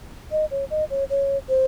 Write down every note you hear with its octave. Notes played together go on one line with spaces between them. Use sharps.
D#5
C#5
D#5
C#5
C#5
C5